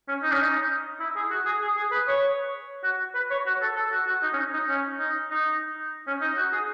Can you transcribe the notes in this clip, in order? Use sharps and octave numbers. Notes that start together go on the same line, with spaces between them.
C#4
D#4
C#4
D#4
E4
G#4
F#4
G#4
G#4
G#4
B4
C#5
F#4
B4
C#5
F#4
A4
A4
F#4
F#4
D#4
C#4
D#4
D#4
C#4
D#4
D#4
C#4
D#4
F#4
G#4